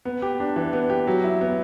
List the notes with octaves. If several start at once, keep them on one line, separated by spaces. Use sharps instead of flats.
B3
G4
D4
E3
B3
G4
F#3
E4
B3